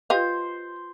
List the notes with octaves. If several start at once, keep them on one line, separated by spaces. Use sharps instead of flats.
F4 G4 B4 C5 D#5 F5